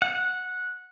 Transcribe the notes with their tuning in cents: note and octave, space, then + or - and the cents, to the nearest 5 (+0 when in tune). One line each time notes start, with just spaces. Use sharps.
F#5 -15